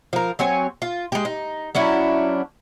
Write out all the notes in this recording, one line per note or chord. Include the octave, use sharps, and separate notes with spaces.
F3 A#4
F#3 C4 C#5 G#5
F4
G#3 G4
D#4
F#3 C#4 D4 E4